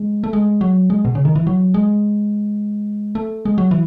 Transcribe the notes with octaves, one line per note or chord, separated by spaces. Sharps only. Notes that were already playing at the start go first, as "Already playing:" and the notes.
Already playing: G#3
A3
G#3
F#3
G#3
B2
C#3
D#3
E3
F#3
G#3
A3
G#3
F#3
E3